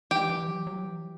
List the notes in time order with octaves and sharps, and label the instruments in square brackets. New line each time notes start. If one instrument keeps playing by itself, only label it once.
[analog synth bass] E3 [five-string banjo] G4
[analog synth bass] E3
F#3
F#3
E3